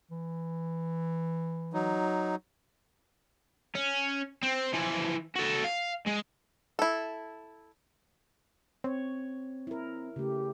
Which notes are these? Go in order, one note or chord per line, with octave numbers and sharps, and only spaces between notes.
E3
F#3 D#4
C#4
C4
E3 F3
F#4 A4
F5
G#3
E4 A4
C4 C#5
E4 A#4
C#3 A3 G4